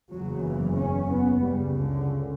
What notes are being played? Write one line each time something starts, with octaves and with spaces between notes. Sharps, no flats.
F#1 E2 C#3 F#3
E3
C#4
B3
C#2 C#3 G3
D3